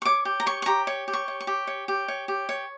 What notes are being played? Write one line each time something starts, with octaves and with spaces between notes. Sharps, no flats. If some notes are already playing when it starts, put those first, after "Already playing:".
C#6
C#5 D6
G4
A#5
C#5 C#6
C#6
G4 A#5
C#5
G4
C#6
C#5
C#6
G4
C#5
G4
C#5
G4
C#5